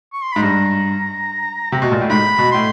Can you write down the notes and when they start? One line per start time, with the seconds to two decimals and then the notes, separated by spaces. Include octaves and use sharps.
0.13 C#6
0.22 C6
0.33 G#2 B5
0.42 G2 A#5
1.72 C3
1.82 B2
1.92 A#2
2.01 A2
2.10 G#2 B5
2.38 B2
2.52 A2 C6